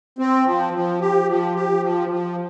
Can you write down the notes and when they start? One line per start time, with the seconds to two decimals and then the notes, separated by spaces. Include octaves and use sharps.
0.18 C4
0.46 F3
0.73 F3
1.00 G4
1.28 F3
1.55 G4
1.82 F3
2.09 F3